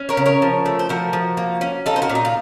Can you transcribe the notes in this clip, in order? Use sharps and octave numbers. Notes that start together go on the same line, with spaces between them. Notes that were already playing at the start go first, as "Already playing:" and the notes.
Already playing: C#4
A#4 C#5
C#3
A#4 C#5
F3
A3
C5
F3 F#4 A#4
F3
A#3
C#4
D#4 F4 A4
C5
F#4 A#4
A#2
D#4
F4